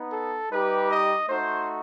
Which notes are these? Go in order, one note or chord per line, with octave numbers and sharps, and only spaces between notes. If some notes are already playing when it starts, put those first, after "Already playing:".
Already playing: B3 D#4
A4
G3 D#4 G4 B4
D#5
A3 D#4 F#4 C5